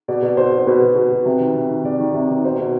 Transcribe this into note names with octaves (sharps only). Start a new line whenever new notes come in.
B2 D5
B2
B2 C5
B2
C5
B2 B4
B2
B2
B2
C3
D#3
C3
D#3
C3 D5
D#3
C3
D#3
B2 C5
B2